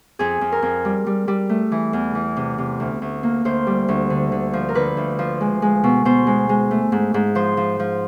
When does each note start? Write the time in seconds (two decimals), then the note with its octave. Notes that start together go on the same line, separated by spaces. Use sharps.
0.19 F2 G#4
0.41 F2
0.52 A#4
0.62 F2
0.85 G3
1.06 G3
1.28 G3
1.49 A3
1.72 E3
1.93 E2
2.15 E3
2.36 C3
2.58 C3
2.80 D2
3.02 D2
3.23 A#3
3.45 D2 C5
3.67 G3
3.88 D2
4.10 D3
4.32 D3
4.53 F3
4.69 A#4
4.75 D3 B4
4.97 D2
5.19 F3
5.40 G#3
5.62 G#3
5.84 B2
6.05 B2 C5
6.27 G#3
6.49 G#3
6.71 A3
6.92 G#2
7.14 G#2
7.35 F3 C5
7.57 F3
7.79 F3